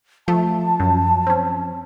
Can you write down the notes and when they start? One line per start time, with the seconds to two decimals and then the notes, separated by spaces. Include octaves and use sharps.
0.28 F3 A3 A5
0.80 F#2
1.27 C4 C#4